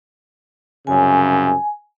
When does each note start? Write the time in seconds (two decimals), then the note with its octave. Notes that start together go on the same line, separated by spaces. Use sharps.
0.87 C2 F#2 C#3 G#5